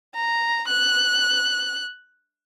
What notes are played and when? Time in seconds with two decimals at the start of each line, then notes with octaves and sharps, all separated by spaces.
0.15 A#5
0.68 F#6